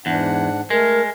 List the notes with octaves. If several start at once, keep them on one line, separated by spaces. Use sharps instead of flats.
E2 G#2 D4 F#5
G#3 A3 A#4